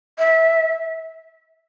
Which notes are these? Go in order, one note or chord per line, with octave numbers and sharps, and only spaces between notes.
E5